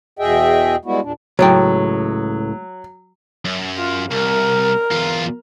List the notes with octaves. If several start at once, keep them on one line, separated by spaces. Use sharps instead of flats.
E2 B2 G#4 D#5 E5 G5
G3 G#3 B3 E4 F#4
E2 A#2 D4
C#2 A2 F#3 G5
F#2
F4
C2 A#4
E2 F4